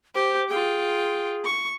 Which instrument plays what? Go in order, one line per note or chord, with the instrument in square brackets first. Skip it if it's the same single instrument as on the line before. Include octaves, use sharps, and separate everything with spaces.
[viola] G4 [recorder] C5
[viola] F4 G5 [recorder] G#4
[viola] C#6